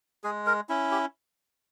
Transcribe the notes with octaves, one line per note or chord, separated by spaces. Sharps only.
G#3 G#4
A#4
C#4 E4
G4